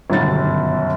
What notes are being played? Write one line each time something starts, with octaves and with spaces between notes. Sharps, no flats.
G1 F#2 B2 D#3 A6